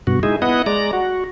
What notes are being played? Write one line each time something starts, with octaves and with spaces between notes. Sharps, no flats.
G2 B2 F#4
G#3 D#4 E4 G#4
B3 E4 D#5 F#5
G#3 D5 A#5
F#4